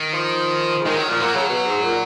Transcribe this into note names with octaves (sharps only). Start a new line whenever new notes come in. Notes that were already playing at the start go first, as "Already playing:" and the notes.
Already playing: D#3
F3
C#3
D#3 G#3
D#3 F#3
A#2 F3
A#2 F#3
C#3
B2
G#2
A#2